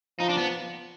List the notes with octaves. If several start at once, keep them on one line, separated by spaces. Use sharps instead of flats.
F3 D#4
D4
B3